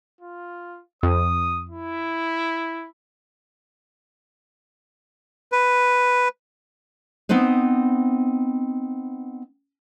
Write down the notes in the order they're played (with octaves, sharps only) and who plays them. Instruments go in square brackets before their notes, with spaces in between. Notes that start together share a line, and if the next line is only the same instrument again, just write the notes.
[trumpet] F4
[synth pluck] F2 [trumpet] D#6
[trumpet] E4
[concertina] B4
[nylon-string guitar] B3 C4 D#4 B4 C5